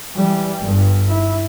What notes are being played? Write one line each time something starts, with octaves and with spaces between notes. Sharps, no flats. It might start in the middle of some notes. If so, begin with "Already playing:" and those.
E3 G3
G1 G2
E4